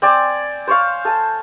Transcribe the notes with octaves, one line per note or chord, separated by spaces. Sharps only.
C4 D5 G#5
C5 C#5 F5
A4 G#5